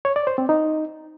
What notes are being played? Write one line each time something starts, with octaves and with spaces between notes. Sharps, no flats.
C#5
D5
C5
C4
D#4